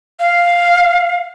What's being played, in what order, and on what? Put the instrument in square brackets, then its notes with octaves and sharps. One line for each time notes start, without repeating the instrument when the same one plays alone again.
[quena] F5